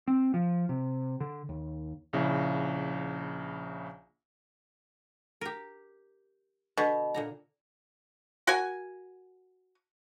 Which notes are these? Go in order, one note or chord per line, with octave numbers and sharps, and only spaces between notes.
C4
F3
C3
D3
D#2
A#1 C#3 E4
G4 A#4
B2 D3 B3
A#2 D3 A#5
F#4 A#4 G#5